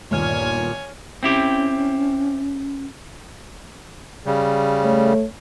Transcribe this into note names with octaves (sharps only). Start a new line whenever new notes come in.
G1 D#2 A#2 C#5 G#5 F6
C4 C#4 E4 G4
C#3 G3
A3 C#5